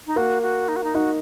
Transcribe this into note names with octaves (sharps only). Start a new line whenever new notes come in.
D#4
A#3 F#4
F#4
D#4
F#4
D#4
D#4 F#4